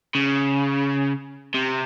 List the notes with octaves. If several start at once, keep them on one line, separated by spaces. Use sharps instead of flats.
C#3
C3